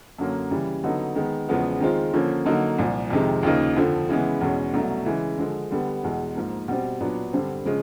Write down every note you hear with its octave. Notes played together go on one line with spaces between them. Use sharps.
F#2 D3 F#3 A#3 C#4
C#3 E3 G3
D3 F#3 B3 D#4
D#3 G#3 B3
E2 C#3 F3 G#3 B3
D#3 G#3 C4 F4
D3 F3 A#3 C#4
D3 F#3 A#3 D#4
C2 A#2 F3
F2 C3 D#3 G#3
D#2 C#3 F3 A#3 D#4
F2 D3 F3
C#3 E3 G#3 B3
E2 B2 G#3 C#4
C2 B2 F#3 A3
C#3 E3 G#3
D3 F3 G#3
D3 G3 B3
E2 B2 G#3
G#2 F3 A#3
B2 G3 C4
A#2 F#3 B3 D4
G2 D3 G3 C4
C#3 F3 G#3